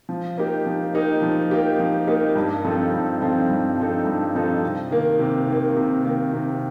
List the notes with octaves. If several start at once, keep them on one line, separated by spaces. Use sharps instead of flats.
F3
A#3 D#4 G4
F3
A#3 D#4 G4
F3
A#3 D#4 G4
F3
A#3 D#4 G4
G2
F3 C4 D#4 A4
G2
F3 C4 D#4 A4
G2
F3 C4 D#4 A4
G2
F3 C4 D#4 A4
C3
D#3 A#3
C3
D#3 A#3
C3
D#3 A#3
C3